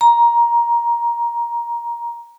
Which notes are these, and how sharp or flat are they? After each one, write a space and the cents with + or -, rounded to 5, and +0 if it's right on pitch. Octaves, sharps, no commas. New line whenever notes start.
A#5 +15